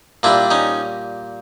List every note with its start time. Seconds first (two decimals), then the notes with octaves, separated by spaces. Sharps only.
0.23 A#2 G3 D4 E4
0.51 C#4 D#4